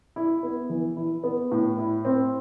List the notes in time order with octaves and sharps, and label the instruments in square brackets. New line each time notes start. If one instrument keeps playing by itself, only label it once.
[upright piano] E4
B3
E3
E4
B3
A2
E4
C4